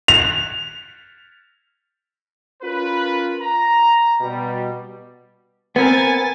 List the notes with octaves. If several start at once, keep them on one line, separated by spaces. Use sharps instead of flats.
F7
C#4 F4 A#4 B4
A#5
B2 G3
B3 C4 A#4 G#5 A6